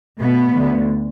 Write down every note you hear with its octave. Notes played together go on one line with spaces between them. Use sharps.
B2 A3 B3
D2 D3 A3